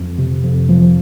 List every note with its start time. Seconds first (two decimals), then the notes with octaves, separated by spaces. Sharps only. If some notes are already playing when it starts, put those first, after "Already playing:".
Already playing: F2
0.18 C3
0.44 F2
0.69 F3